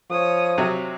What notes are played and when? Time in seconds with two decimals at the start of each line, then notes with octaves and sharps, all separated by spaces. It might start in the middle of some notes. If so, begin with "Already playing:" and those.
0.11 F3 C#5 D#6
0.58 C3 F#3 C4